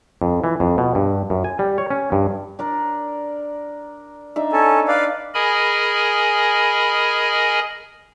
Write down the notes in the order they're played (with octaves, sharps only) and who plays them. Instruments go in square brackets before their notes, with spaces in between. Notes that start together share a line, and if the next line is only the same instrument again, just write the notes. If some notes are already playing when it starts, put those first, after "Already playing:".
[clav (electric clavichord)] F2
E3
F2
B2
G2
F#2
G#5
G3
C#5
C#4
G2
[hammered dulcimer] D4 A#4 D5
D4 D#4 E5
[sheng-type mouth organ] C#4 A4
B4 D5 F5
[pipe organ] G#4 A#4 D#5 G#5 B5